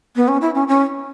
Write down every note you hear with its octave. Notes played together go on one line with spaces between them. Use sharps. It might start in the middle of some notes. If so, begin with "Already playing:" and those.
B3
C#4
E4
C#4
C#4